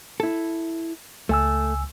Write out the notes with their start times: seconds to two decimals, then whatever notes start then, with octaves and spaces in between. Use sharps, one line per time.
0.20 E4 A4
1.29 C#2 A3 G#5 E6